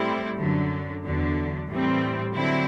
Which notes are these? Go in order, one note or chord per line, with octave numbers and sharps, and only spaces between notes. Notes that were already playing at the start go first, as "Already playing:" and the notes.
Already playing: A2 G3 C4 E4
F#2 D3 F#3
E2 D3 F#3
A2 E3 G3 C4
D3 F#3 C4 E4